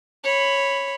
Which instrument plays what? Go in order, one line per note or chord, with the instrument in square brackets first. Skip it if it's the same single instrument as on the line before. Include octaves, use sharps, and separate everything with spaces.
[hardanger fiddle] C#5 B5